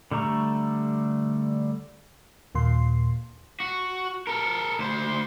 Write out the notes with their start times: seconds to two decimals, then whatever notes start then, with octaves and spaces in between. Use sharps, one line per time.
0.11 D3 G3 A3 A#5 C#6
2.55 D#2 A#2 C6
3.60 F#4
4.27 A4 A#4
4.79 D2 C5